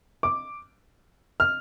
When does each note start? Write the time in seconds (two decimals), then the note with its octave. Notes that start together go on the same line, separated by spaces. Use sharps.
0.23 D6
1.40 F6